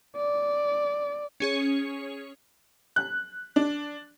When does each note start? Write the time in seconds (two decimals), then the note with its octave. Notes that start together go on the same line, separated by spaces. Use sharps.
0.17 D5
1.40 C#4 G#4 C#5
2.96 F#6
3.56 D4